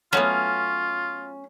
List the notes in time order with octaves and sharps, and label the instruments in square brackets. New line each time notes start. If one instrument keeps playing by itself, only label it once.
[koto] F#3 A3 B3 [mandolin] C#4 [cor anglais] F4